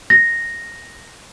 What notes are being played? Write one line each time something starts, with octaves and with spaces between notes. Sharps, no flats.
A#6